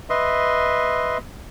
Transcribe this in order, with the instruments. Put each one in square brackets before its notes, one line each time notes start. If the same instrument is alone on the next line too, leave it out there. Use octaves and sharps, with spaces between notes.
[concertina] B4 D#5 E5 C6